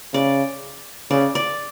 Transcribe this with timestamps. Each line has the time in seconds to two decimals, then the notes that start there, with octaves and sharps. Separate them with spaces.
0.14 C#3 D5
1.11 C#3 D5
1.35 D5